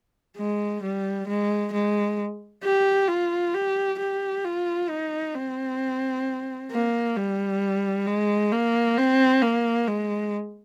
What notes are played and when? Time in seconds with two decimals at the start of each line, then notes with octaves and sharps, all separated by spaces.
0.38 G#3
0.83 G3
1.28 G#3
1.73 G#3
2.64 G4
3.08 F4
3.54 G4
3.99 G4
4.45 F4
4.89 D#4
5.35 C4
6.71 A#3
7.16 G3
8.07 G#3
8.52 A#3
8.97 C4
9.42 A#3
9.88 G#3